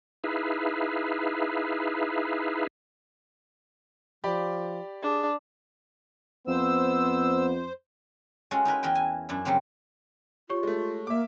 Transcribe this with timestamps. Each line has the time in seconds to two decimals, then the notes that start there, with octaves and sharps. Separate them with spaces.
0.24 D#4 E4 G#4 B4 E5 F5
4.24 F3 G4 D5 B5
5.03 D4 G#4
6.47 F2 B3 C5 E6
8.51 G#3 C#4 F4 F#4 A4
8.65 D#4 E4 A#4 B4
8.83 E2 E4 A#4 B4 G5
8.95 G#5
9.29 F#2 D4 E4
9.45 C#3 F#3 G3 A#3 C4
10.49 F4 G4 C#5 C#6
10.63 G#3 A3
11.07 A#3 E5 D6